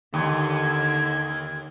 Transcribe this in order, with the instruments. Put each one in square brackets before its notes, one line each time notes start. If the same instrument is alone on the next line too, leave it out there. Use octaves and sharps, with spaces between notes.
[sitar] D#2 [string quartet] D3 G#6